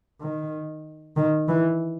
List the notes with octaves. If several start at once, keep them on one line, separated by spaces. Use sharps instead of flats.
D#3
D#3
E3